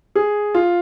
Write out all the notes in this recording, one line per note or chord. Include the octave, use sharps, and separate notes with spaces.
G#4
F4